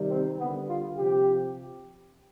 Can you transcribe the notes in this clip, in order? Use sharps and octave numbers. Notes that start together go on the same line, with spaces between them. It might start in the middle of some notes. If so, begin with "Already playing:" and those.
Already playing: C3 D#3 G3
C4
D3 G3 B3
F4
C3 F3 G4